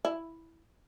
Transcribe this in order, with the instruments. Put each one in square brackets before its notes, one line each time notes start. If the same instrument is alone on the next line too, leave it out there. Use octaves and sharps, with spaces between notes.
[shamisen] E4